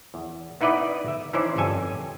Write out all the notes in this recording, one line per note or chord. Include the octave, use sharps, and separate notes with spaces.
E2
B3 D#4 E4 B4 D5 D#5
E5
E3 C#4 D#4 E4 C5 D5
G1 F2 A4 G#5